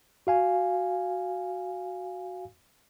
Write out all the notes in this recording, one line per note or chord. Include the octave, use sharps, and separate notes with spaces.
F#4 F5 G#5